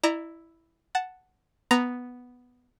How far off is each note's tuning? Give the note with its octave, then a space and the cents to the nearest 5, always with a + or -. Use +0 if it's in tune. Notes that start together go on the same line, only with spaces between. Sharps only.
E4 +0 D5 +45 A#5 +0
F#5 +0 A5 +0
B3 +0 A#5 +0